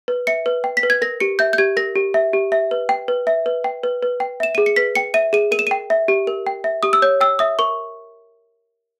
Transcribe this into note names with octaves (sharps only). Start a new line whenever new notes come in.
B4
E5 C#7
B4
G5
B6
B4
G#6
A#4 A#6
G4 C#7
E5 G6
G6
G4 G#6
A#4 A#6
G4
E5
G4
E5
B4
G5
B4
E5
B4
G5
B4
B4
G5
E5 E7
G#4 D#7
C#7
B4 B6
G5 C#7
E5 D#7
G#4 D#7
A#4 D#7
E7
G5 D#7
E5
G4
A#4
G5
E5
G4 D#6
E6
C#5 G6
G5 E6
E5 D#6
A#4 C#6